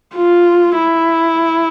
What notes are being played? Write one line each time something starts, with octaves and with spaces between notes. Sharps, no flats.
F4
E4